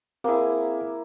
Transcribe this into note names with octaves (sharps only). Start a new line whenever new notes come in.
A#3 C4 E4 G#4